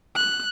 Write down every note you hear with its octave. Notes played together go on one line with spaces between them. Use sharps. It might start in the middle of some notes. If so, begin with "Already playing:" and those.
F#6